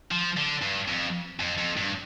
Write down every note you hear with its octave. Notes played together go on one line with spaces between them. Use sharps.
F3
D3
G2
F2
F2
F2
G2